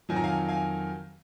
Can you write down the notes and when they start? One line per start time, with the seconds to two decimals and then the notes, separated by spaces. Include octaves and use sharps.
0.09 F2 D#3 F#3 G#5
0.16 A#5
0.24 F5 G#5
0.49 F5 G#5